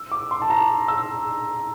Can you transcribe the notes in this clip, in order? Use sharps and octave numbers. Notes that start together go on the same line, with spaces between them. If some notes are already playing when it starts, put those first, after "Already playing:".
Already playing: E6
D6
C6
A5
A#5
E6